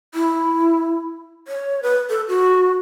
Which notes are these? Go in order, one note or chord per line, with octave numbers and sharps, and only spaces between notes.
E4
C#5
B4
A4
F#4